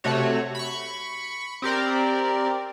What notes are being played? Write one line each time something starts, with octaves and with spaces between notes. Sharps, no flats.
C3 A3 F#4 C#5
B5 C#6
C4 G4 A#4 D5